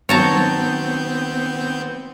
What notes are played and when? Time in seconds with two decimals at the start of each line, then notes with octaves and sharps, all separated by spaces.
0.09 D#3 F#3 B3 C4 C#5 A5 A#5 G6